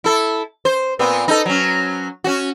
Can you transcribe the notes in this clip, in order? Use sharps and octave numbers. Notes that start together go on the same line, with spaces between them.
E4 A4
C5
A#2 B3 C4
D#4 A4
F#3 C#4
C#4 F#4